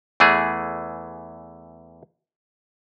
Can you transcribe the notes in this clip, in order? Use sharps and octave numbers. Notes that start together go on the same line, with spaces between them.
E2 E3 A3 G#4